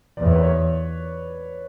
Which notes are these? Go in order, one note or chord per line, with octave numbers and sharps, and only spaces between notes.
E2 D5
C#5
B4
C#5